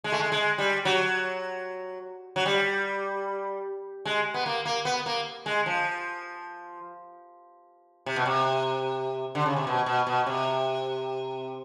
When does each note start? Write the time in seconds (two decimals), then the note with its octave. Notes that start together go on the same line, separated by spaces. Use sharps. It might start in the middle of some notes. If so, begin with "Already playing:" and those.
0.04 G#3
0.12 A3
0.19 G#3
0.32 G#3
0.58 G3
0.85 F#3
2.36 F#3
2.46 G3
4.05 G#3
4.34 B3
4.46 A#3
4.65 A#3
4.85 B3
5.06 A#3
5.46 G#3
5.66 F3
8.06 C3
8.16 B2
8.26 C3
9.35 D3
9.46 C#3
9.56 C3
9.67 B2
9.86 B2
10.07 B2
10.26 C3